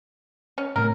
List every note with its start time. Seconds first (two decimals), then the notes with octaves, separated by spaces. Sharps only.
0.58 C#4
0.76 A2 C3 A#4